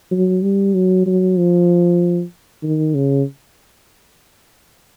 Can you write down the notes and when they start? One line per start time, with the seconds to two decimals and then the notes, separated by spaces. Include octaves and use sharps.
0.11 F#3
0.43 G3
0.74 F#3
1.06 F#3
1.37 F3
2.63 D#3
2.95 C#3